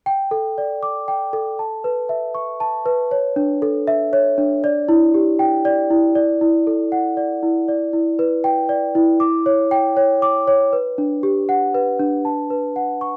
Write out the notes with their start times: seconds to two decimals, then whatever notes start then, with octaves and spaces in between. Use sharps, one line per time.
0.06 G5
0.31 A4
0.58 D5
0.83 D6
1.08 G5
1.33 A4
1.59 A5
1.84 B4
2.09 E5
2.35 C#6
2.60 A5
2.86 B4
3.11 C#5
3.36 D4
3.62 A4
3.87 E5
4.13 C#5
4.38 D4
4.64 D5
4.89 E4
5.14 G4
5.39 G5
5.65 D5
5.90 E4
6.15 D5
6.41 E4
6.67 A4
6.92 F#5
7.17 D5
7.43 E4
7.68 D5
7.93 E4
8.19 B4
8.44 G5
8.69 D5
8.95 E4
9.20 D6
9.46 C#5
9.71 G5
9.97 C#5
10.22 D6
10.48 C#5
10.73 B4
10.98 D4
11.23 G4
11.49 F#5
11.75 B4
12.00 D4
12.25 A5
12.50 B4
12.76 F#5
13.01 C#6